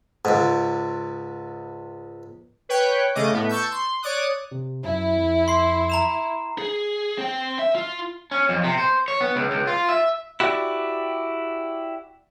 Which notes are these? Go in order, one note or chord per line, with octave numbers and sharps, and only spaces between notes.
C#2 G#2
B4 C#5 G5 F#6
C#3 A3 D#5 D6
A2 B3
A5 C#6 E6 G6
C6
C#5 D5 D6 D#6 F#6
C3
F#2 E4
F2
C6 C7
A#5 B5 E7
G#4
C4 G5
E5
F4
C#4
F2
C3
C5
C#5
B3
C#2
C#2
F4
E5
E4 F#4 G4 D5